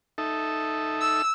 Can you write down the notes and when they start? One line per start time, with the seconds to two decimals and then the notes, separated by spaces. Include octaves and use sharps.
0.18 D#4 A4 E5
1.01 E6